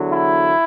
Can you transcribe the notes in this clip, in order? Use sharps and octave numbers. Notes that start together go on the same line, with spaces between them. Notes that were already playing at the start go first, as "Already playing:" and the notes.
Already playing: E2 D3 F#3
E4